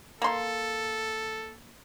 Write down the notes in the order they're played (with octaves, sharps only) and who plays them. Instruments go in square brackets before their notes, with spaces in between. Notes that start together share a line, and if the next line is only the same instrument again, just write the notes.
[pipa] A#3 C6 [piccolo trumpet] A4